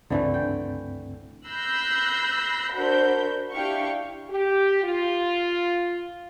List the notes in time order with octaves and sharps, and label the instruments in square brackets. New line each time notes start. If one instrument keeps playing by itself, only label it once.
[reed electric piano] C#2 G2 C4 [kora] D3 E3 A3
[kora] G5
[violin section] B5 E6 F#6 G6 A#6 C7
D4 F#4 A#4 C5 B5 G6
D4 E4 G4 F5 G5 C#6
[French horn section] G4
F4